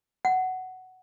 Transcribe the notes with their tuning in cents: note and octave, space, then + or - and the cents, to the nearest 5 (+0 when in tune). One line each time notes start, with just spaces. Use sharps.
F#5 +10